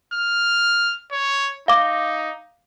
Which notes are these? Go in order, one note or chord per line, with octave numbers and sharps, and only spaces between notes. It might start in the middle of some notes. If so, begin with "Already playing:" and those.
F6
C#5
D#4 F5 D6